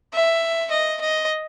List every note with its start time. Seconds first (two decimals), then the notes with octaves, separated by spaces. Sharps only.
0.14 E5
0.71 D#5
1.01 D#5